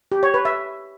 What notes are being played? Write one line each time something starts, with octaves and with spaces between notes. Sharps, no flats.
G4
C#5
B4
E5